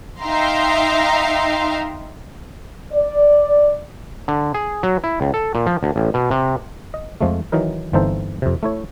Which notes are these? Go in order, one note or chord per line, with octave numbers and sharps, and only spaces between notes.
D#4 E5 F5 G5 A#5 C6
D5
D3
G#4
F#3
E4
C#2
A4
A#2
F3
D2
A1
B2
C3
D#5
F2 F3 G#3 A3
D#3 E3 F#3 D#4 A#4
G1 E3 C4 D#4 A4 C5
F2 C3
A3 E4 C#5